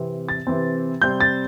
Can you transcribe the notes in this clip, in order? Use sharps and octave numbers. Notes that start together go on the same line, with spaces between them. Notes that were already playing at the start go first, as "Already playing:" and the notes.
Already playing: C3 E3 C4
A6
C3 E3 C4
C3 G3 C4 G6
A6